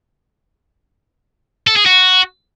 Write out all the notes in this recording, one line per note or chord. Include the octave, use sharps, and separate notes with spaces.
A4
G#4
F#4